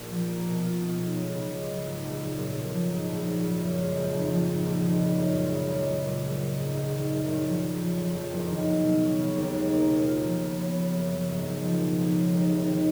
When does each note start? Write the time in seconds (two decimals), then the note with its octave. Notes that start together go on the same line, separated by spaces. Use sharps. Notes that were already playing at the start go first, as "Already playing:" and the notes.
Already playing: A#1 A#2
0.11 F3
0.28 A#3
0.46 B2
0.63 F4
0.81 B2
0.98 B1
1.16 G#3
1.33 C#3
1.50 C#2
1.67 F#3
1.85 G#2
2.03 A#1
2.20 F#3
2.37 A#2
2.55 B1
2.72 F3
2.90 G#2
3.08 A#1
3.26 F#3
3.43 C#3
3.60 F#2
3.78 G#3
3.95 F2
4.12 F1
4.30 F3
4.47 G#2
4.65 A#1
4.83 D#3
4.99 C#3
5.18 F#2
5.35 G#3
5.52 C#3
5.70 C#2
5.87 F#3
6.04 A#2
6.23 A#1
6.39 G#3
6.56 G#2
6.75 A#1
6.91 D#3
7.10 F#2
7.27 F#1
7.45 F3
7.62 C#3
7.79 F2
7.97 F#3
8.14 F2
8.31 F#1
8.48 D#3
8.67 F#3
8.83 B2
9.01 C#4
9.19 C#3
9.36 D#2
9.54 G#3
9.72 A#3
9.89 B2
10.06 F4
10.24 F3
10.41 C#3
10.59 B3
10.76 C#3
10.94 F#2
11.12 F#3
11.28 G#2
11.47 G#1
11.63 F3
11.80 B2
11.98 B1
12.16 G#3
12.33 D#2
12.50 F1
12.68 D#3